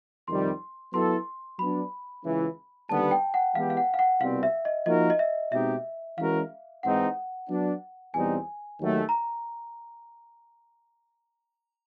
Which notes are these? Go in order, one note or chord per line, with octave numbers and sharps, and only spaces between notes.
F2 C3 D#3 G3 C6
F#3 B3 E4 A4 C6
F#3 B3 D4 B5
C#2 C#3 E3
D#2 D3 G3 B3 A5
G5
F#5
E3 G#3 B3 E4 G4 F5
F5
F#5
F5
F#5
C2 B2 G3 C4 F5
E5
D#5
F3 A#3 D#4 F#4 A#4 D#5
D#5
E5
B2 G#3 C4 D#4 G4 E5
E3 G#3 C#4 F#4 A#4 F5
G#2 E3 G#3 C4 D#4 F#5
F#3 B3 D4
E2 B2 G3 C4 D#4 G#5
D#2 D#3 F#3 A3
A#5